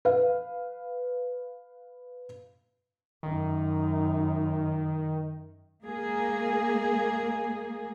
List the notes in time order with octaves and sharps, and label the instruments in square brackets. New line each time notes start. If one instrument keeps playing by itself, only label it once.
[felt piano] B4 F5
[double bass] F#2 D#4 [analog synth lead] D#3
[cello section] G#3 A#3 G#4